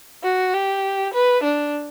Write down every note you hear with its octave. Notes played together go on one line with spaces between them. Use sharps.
F#4
G4
B4
D4